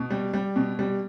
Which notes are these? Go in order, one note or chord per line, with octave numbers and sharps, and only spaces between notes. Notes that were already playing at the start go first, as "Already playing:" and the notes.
Already playing: B2
G3
G3
B2
G3